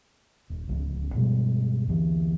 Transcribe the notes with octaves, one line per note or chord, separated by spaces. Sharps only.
D#1
D1 C#2
G2 B2 G3 G#3
D2 E3